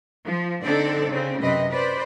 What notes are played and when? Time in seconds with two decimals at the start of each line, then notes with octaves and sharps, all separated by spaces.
0.24 F3
0.63 D3 C4 D4 D#4 A4 D5
1.08 C#3 C4
1.41 F#2 C3 C4 B4 D#5
1.71 B4 C5 D5